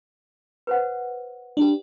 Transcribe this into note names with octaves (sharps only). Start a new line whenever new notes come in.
B4 C5 F#5
D4 G4